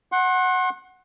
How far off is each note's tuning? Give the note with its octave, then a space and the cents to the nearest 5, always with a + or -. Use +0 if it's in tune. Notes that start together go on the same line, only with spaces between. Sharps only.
F#5 +0 C6 +40